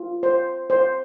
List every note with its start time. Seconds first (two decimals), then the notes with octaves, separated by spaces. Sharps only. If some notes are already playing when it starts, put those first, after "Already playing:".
Already playing: F4
0.23 C5
0.70 C5